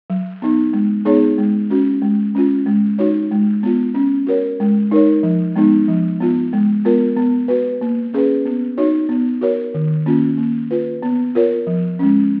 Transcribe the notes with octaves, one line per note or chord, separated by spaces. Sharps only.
F#3
B3 D#4
G#3
B3 D#4 G#4 C#5
G#3
C#4 F#4
G#3
C#4 F4
G#3
D#4 F#4 C#5
G#3
B3 F4
C#4
F#4 A#4 C#5
G#3
D#4 A#4 C#5
F3
G#3 B3 D#4
F3
B3 F4
G#3
B3 F4 A#4
B3
F#4 B4
A#3
C#4 G#4 B4
B3
D#4 F#4 C#5
B3
F#4 A#4 C#5
D#3
A#3 C#4 F4
A#3
F4 B4
B3
F4 A#4 C#5
F3
G#3 C#4